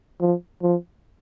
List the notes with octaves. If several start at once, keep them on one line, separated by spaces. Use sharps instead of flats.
F3
F3